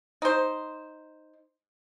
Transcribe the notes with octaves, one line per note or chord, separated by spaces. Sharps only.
D#4 C5